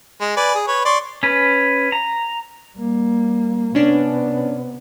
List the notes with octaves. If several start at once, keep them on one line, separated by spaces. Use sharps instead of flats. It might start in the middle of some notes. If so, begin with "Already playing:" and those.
G#3
B4 D5 G#5
G#4
B4 C#5
D5 C6 C#6
C#4 B4
A#5
G3 A#3
C3 B3 C#4 D4